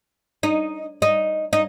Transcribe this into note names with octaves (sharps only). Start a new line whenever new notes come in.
D#4
D#4
D#4